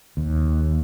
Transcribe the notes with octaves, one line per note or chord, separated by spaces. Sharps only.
D#2